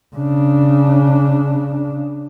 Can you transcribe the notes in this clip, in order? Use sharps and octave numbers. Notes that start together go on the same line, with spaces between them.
C#3 D4